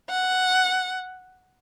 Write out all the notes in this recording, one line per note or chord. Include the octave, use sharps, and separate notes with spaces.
F#5